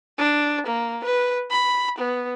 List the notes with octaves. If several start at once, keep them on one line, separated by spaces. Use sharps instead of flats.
D4
A#3
B4
B5
B3